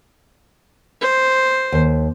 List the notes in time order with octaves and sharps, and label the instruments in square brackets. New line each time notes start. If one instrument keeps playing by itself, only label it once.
[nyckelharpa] C5
[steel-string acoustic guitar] D#2